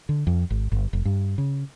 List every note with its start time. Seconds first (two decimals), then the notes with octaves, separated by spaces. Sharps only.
0.09 D3
0.27 F2
0.50 G#1
0.72 G1
0.93 F1
1.05 G2
1.38 C#3